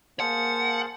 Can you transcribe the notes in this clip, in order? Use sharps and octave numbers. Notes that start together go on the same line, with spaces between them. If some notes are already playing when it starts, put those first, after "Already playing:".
A#3 G#4 C5 F5 F#5 A5